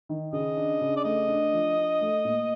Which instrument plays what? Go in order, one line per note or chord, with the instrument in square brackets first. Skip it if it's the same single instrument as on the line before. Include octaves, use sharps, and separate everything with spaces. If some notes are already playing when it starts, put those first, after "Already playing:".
[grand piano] D#3
[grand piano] C#3 [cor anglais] D#5
[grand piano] D4
C#3
[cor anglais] D5
[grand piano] A3 [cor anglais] D#5
[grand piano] D4
F3
D4
A3
A#2